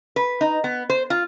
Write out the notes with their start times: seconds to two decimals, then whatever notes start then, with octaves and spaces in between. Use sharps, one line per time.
0.16 B4
0.41 D#4
0.64 B3
0.90 C5
1.10 F4